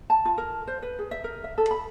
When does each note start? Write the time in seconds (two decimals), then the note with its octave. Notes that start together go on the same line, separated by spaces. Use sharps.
0.10 A5
0.25 F4
0.38 A#4
0.67 C5
0.82 B4
0.99 G#4
1.11 E5
1.24 A#4
1.44 E5
1.58 A4
1.71 B5